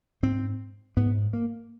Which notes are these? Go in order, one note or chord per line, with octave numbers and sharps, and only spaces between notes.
G#2 C4
G#2 B3
A#3